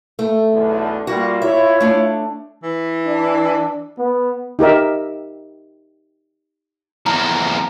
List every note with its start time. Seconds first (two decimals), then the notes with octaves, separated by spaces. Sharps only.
0.19 A3
0.53 B1 E2 D3
1.07 G3 A#3 F4 F#4
1.42 E4 F4 C#5 E5
1.80 A3 D4
2.63 E3
3.06 D4
3.99 B3
4.59 D#4 G4 A#4 E5
7.06 E2 F3 A#5